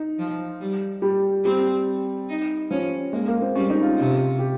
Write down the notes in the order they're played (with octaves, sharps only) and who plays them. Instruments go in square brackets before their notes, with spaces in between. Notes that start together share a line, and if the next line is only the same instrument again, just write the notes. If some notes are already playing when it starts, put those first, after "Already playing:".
Already playing: [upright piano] D#4
[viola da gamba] F3
G3
[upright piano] G3
[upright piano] G3 [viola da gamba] C4
[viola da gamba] D#4
[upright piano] F3 [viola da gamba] C#4
[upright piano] G#3 [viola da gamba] A#3
[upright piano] A#3
C4
[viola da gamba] G3 [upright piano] C#4
[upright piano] D#4
F4
[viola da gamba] C3
[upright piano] G4